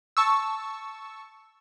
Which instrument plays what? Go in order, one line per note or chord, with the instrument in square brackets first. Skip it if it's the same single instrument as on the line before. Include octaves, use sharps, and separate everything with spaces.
[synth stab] A5 C#6 E6